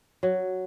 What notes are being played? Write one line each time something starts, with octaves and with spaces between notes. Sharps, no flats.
F#3